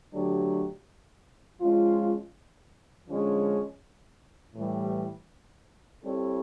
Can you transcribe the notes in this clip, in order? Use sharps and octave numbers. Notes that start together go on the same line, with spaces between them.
D3 F#3 A3 D4 G4
F3 G#3 C#4 F4
D3 F3 G#3 C#4
A2 E3 G3
G3 C4 E4 A4 C#5